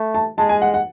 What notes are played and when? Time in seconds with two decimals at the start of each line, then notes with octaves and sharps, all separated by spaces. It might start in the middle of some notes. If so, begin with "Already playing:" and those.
Already playing: A3
0.14 A5
0.38 G#3 A5
0.49 G#5
0.62 F#5
0.74 F#5